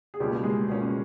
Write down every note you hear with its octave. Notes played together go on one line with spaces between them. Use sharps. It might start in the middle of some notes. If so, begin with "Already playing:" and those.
G#4
C#2 B2 G3 A#3 C#4 G4
G#3 G#4
C#2 B2 G3 A#3 C#4